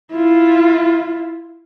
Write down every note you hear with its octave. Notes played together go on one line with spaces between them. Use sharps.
E4 F4